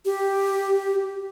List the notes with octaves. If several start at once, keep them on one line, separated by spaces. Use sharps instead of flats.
G4